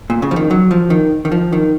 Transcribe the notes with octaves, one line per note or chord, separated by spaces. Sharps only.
A#2
C#3
F3
D#3
F#3
F3
D#3
D#3
F3
D#3